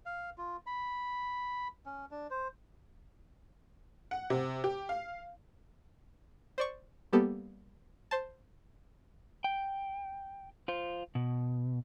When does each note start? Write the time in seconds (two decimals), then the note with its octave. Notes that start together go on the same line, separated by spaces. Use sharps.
0.06 F5
0.38 F4
0.66 B5
1.86 C#4
2.11 D4
2.30 C5
4.11 F#5
4.30 C3
4.64 G4
4.89 F5
6.58 C5 D5 C#6
7.13 G3 A#3 B3 G4 A4
8.11 C5 A5
9.44 G5
10.68 F4 C5
11.15 B2